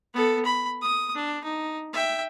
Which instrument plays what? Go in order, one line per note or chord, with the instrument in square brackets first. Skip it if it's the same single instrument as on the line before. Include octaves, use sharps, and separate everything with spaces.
[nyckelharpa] B3 A4
B5
D#6
D4
D#4
E5 G5